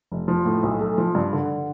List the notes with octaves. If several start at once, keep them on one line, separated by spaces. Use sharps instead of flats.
F1
F3
A2
B1
A3
F3
G2
D3